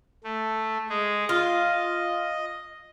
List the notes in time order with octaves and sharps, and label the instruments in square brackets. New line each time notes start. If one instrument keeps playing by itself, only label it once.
[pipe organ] A3
G#3 G#4
[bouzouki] F4 [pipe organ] D#5